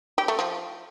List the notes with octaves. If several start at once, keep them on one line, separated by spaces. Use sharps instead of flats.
G4
A3
F3